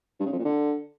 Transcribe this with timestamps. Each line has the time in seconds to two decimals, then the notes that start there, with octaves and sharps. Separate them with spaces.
0.20 G2
0.26 C#3
0.32 F2
0.39 A#2
0.45 D3